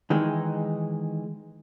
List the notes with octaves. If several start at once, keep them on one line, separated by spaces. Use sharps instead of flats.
D#3 E3 G#3 D#4